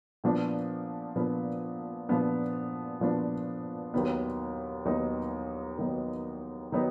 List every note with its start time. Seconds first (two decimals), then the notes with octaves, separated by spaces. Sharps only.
0.24 A#2 F3 B3 D4
1.16 A#2 F3 B3 D4
2.09 A#2 F3 B3 D4
3.00 A#2 F3 B3 D4
3.94 D#2 D#3 F#3 B3 D#4
4.85 D#2 D#3 F#3 B3 D#4
5.78 D#2 D#3 F#3 B3 D#4
6.72 D#3 F#3 B3 D#4